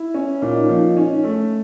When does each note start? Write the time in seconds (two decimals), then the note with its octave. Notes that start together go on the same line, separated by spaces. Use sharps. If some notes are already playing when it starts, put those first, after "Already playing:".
Already playing: E4
0.14 C#4
0.42 A#2 D#4
0.69 F3
0.97 C#4
1.24 A3